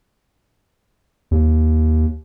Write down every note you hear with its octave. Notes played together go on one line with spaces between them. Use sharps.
D#2